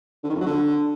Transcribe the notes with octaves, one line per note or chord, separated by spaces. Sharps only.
D3
D#3
F2
F#3
D3